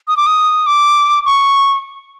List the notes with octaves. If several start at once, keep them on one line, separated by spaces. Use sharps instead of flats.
D#6
D6
D#6
D6
C#6